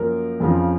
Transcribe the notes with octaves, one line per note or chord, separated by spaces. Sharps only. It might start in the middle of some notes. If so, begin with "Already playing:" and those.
Already playing: F#2 F3 A#3 A#4
F2 C#3 F3